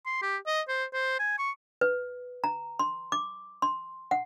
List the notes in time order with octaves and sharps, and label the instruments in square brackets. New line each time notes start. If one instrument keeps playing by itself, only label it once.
[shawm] C6
G4
D#5
C5
C5
G#5
C#6
[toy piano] B4
A#5
C6
D6
C6
F#5